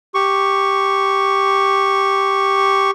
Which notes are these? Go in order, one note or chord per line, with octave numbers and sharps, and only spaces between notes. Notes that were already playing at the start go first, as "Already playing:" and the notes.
G4 C#6